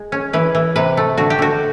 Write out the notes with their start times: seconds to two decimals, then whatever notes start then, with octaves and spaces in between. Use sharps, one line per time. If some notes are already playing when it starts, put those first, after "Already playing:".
Already playing: G#3
0.12 C#4
0.33 E3 B4
0.55 E3
0.76 C3 B4
0.97 A3
1.17 D3 F#4
1.30 G4
1.39 D3 F#4